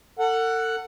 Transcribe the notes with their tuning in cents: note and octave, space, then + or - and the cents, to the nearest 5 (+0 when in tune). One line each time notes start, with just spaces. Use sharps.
A4 +40 F#5 +0